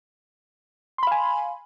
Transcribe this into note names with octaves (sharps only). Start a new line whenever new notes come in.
F5 G#5 B5 C6